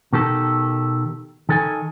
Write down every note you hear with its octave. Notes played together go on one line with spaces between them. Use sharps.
B2 D#3 G4 A4
D#3 A4 G#5